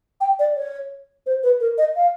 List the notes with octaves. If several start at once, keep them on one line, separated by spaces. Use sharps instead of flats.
G5
D5
C#5
C5
B4
A#4
D#5
F5